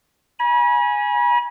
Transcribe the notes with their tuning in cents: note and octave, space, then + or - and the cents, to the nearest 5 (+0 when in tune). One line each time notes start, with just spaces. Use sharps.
G#5 +0 B5 -40